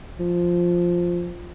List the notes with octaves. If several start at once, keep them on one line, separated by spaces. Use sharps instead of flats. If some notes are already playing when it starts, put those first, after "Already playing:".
F3